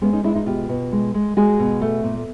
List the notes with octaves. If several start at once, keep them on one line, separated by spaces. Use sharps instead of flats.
G#3 B3 C#4
C#4 D#4
G#3 D4 E4
D#4 F4
B2 F4 G4
B2
G#3
G#3
G#3 F#4 G#4
B2
A3
A#2